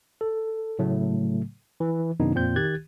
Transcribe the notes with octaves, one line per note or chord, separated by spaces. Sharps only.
A4
A2 C#3 F#3 A3
E3
F#2 C3 D#3 B3 D4 D#4
F2 A#2 C4 G6
D#3 G4 F#6 G#6 A6